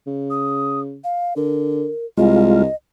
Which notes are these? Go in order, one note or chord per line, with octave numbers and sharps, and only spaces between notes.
C#3
D#6
F5
D3 A#4
C2 G#3 F4 D#5